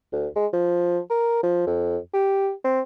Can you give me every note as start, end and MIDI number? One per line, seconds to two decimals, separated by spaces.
0.13 0.27 38
0.36 0.47 56
0.53 0.99 53
1.10 1.40 70
1.43 1.64 53
1.67 1.98 41
2.13 2.52 67
2.64 2.81 60